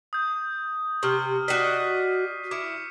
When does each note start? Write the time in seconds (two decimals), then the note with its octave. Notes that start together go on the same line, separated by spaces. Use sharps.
0.13 D#6 G6
1.03 C3 C#6 F6
1.48 F#4 D5 D#5 B6 C7 D#7
2.51 E4 D6 C#7